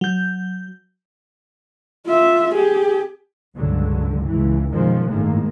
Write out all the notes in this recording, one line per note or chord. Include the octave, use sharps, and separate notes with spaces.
F#3 G6
F4 E5
G4 G#4
C#2 G2 D3 F#3
C#2 E3
F#2 B2 D#3 F3 G#3
G1 A2 D#3 G#3 A#3